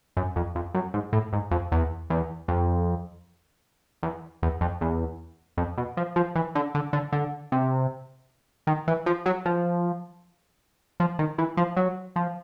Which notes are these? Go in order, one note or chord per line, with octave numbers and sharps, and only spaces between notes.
F#2
F2
F2
F#2
G#2
A2
G#2
F2
E2
E2
F2
E2
E2
F2
E2
F2
B2
F3
F3
E3
D3
D3
D3
D3
C3
D#3
E3
F3
F#3
F3
F3
D#3
E3
F3
F#3
F3